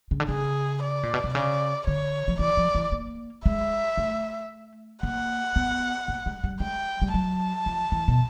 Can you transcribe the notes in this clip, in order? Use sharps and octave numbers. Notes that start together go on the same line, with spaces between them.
C#3
D3
C#3 G#4
D5
A#2
B2
C3
C#3 D5
D3 C#5
F3
E3 D5
F3
E3
A#3
G#3 E5
A3
A#3 F#5
B3
A#3
G#3
G3
G#3 G5
G3
F#3 A5
F3
E3
B2